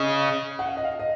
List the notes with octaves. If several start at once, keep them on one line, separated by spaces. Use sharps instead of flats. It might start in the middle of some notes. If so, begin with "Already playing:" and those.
Already playing: C#3 D#5
F#5
F5
D#5
F5
D#5